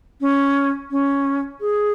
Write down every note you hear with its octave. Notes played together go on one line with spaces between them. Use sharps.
C#4
C#4
G#4